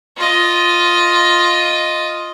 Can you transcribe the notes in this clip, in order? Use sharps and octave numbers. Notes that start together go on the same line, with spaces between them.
F4 D#5